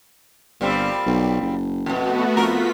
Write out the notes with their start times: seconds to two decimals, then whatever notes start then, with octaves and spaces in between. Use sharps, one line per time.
0.61 G1 A#2 G3 C4
1.06 B1
1.41 F#1
1.86 F2 B2 A3 B3 F#4
2.37 F2 F4 A#4 B6